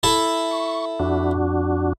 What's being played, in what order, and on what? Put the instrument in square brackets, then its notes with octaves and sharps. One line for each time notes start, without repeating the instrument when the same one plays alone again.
[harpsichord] E4 A4 E5
[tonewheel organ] C#6
F2 D4 F#4